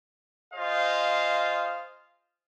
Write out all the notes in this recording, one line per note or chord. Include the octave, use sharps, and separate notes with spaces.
F4 G#4 C5 D#5 F5